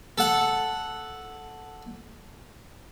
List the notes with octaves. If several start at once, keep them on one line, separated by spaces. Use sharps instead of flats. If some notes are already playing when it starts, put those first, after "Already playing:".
A4 F#5